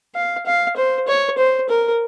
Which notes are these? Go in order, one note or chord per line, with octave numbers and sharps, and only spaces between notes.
F5
F5
C5
C#5
C5
A#4